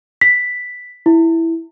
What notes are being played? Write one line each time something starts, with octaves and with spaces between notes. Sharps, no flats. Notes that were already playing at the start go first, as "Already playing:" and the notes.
B6
E4